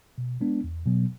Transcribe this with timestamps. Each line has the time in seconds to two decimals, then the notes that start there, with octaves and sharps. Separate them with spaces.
0.18 B2
0.41 G#3 B3 D4
0.64 E2
0.86 B2 F#3 B3